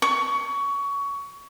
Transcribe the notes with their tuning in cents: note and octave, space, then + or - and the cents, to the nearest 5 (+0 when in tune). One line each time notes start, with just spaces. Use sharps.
C#6 +20